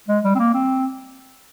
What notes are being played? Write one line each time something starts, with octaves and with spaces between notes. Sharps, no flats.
G#3
G3
C4
A#3
C4